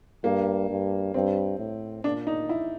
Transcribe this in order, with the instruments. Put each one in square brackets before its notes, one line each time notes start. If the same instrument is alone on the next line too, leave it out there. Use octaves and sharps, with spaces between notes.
[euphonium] G2 [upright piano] A#3
[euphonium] G2
[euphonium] G2 [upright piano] C4
[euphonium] A2
[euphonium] A#2 [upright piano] D4
[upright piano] D#4
E4